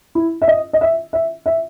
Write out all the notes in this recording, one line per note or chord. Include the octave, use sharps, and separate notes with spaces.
E4
E5
D#5
D#5
E5
E5
E5